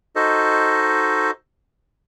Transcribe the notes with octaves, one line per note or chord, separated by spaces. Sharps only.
D#4 F#4 A4 C5 D#5